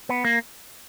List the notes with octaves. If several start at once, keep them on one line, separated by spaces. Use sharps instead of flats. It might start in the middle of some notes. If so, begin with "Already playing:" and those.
B3
A#3